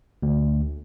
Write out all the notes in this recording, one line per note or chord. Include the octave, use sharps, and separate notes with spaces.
D2